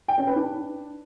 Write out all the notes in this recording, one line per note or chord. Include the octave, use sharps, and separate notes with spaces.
G5
C#4
B4
D4